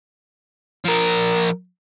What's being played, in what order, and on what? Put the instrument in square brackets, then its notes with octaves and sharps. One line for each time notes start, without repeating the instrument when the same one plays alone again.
[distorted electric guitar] F3 A#4